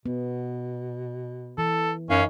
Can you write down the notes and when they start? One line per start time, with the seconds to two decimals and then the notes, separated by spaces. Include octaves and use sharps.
0.06 B2 B3
1.58 E3 A4
2.10 F#2 C#4 D#4 F5